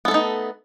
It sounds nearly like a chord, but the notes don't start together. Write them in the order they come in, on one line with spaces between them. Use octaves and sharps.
B3 A4 A3 D#4